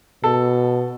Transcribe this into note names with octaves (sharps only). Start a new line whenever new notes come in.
B2 A4